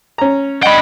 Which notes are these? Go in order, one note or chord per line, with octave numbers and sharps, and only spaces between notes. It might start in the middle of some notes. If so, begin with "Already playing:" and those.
C#4 A#5
D4 D#5 F#5 G5 B5